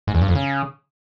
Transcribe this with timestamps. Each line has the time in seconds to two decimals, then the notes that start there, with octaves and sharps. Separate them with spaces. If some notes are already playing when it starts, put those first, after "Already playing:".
0.07 G#2
0.14 E2
0.21 G2
0.28 F2
0.35 C#3